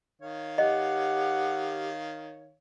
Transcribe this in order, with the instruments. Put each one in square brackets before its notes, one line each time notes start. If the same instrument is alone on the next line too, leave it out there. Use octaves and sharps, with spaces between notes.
[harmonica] D#3 C#5 F5
[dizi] G4 [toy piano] D#5 [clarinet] F#5